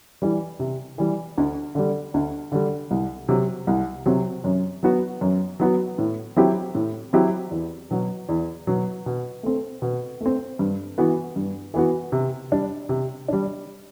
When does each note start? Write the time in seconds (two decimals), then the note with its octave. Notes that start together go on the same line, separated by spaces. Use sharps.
0.22 E3 G3
0.60 C3
0.98 E3 G3
1.38 D2
1.75 D3 G3
2.14 D2
2.52 D3 G3
2.91 C2
3.29 C3 F#3 C4
3.67 C2
4.06 C3 F#3 C4
4.44 F#2
4.83 F#3 B3 F#4
5.21 F#2
5.60 F#3 B3 F#4
5.98 A2
6.37 F#3 C4 E4 G4
6.75 A2
7.13 F#3 C4 E4 G4
7.51 E2
7.91 B2 F#3
8.29 E2
8.67 B2 F#3
9.06 B2
9.43 A3 C4
9.82 B2
10.21 A3
10.26 C4
10.59 G2
10.98 E3 B3 F#4
11.36 G2
11.74 E3 B3 F#4
12.12 C3
12.52 G3 D4
12.89 C3
13.28 G3 D4